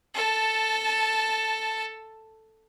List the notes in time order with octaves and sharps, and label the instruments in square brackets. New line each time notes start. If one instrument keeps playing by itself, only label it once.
[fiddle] A4 A5